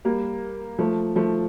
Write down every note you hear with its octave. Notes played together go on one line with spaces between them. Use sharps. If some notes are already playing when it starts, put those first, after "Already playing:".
G3 A#3
F3 A3
F3 A3